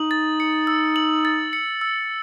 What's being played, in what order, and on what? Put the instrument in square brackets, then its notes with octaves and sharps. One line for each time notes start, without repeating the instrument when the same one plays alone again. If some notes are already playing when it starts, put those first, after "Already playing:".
Already playing: [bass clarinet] D#4 [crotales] F#7
[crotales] A6
C#7
E6
F#7
A6
C#7
E6